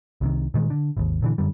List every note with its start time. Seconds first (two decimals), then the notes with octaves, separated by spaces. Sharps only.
0.21 C2 C3 D#3
0.54 A#2 D#3 G#3
0.70 D3
0.97 G#1 D#2
1.22 A#2 D3 E3
1.38 F#2 D3 G3